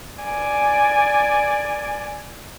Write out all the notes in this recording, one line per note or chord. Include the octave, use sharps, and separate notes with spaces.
D5 G#5